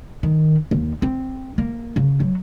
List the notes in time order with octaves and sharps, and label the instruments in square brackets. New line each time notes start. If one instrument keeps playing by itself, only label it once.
[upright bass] D#3
D#2
C4
A#3
C#3
F#3